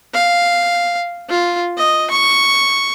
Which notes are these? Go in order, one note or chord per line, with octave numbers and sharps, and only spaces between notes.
F5
F4
D#5
C#6